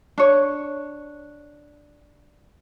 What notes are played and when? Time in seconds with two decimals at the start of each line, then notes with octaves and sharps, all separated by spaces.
0.18 D4 C#5